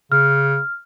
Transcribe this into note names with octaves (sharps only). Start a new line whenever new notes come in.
C#3 F6